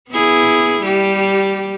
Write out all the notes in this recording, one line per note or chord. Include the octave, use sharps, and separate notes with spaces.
B3 E4 G#4
G3 G4